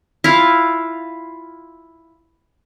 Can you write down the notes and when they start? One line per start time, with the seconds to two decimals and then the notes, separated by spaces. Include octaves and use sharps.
0.24 E4 F4 F5